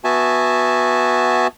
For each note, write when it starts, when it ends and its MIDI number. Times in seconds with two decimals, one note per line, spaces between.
0.04 1.47 59
0.04 1.47 66
0.04 1.47 76
0.04 1.47 80
0.04 1.47 81